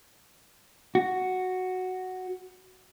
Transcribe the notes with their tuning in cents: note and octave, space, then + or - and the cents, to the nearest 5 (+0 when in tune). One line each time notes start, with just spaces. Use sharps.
F#4 +0